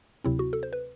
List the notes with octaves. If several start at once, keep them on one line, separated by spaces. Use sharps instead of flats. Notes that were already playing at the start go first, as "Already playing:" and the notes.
D2 C3 F#3 C4 E4
F#4
A4
C5
B4